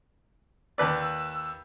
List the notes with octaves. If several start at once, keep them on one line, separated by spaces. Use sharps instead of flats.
D#2 B4 D5 E6